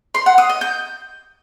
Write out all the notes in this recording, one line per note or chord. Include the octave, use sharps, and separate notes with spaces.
C6
F#5
D#6
D#5
G6